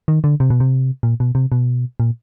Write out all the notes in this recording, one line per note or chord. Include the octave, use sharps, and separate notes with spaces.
D#3
D3
C3
B2
C3
A#2
B2
C3
B2
A#2